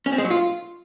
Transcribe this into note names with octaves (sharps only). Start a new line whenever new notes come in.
C#4
C4
G#3
F#3
F4